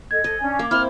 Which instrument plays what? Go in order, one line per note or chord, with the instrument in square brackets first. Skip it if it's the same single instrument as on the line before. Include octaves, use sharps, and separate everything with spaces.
[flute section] A4 D#5 [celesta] G#6
[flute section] A4 [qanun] D#5
[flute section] C#4 D4 G#5
[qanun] A#3 [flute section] D6
[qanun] C4 E4 [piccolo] F6